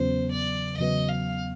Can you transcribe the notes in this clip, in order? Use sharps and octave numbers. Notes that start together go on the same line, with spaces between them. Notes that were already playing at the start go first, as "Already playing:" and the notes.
Already playing: E2 C#3 F#3 B3 C5
D5
E2 C#3 F#3 B3 D#5
F5